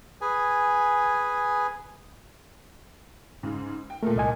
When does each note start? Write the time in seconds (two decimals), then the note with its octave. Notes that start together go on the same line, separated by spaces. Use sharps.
0.21 G#4 B4 G#5
3.43 G#2 C#3
3.90 G5
4.03 A#2 A3 A#3 A4 A#4
4.16 C2 D#5 G#5